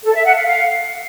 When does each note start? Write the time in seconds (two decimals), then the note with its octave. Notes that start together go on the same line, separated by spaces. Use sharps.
0.04 A4
0.14 E5
0.25 F#5
0.35 F5
0.45 F5